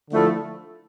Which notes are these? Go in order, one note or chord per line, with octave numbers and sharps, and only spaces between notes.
D3 F3 A3 E4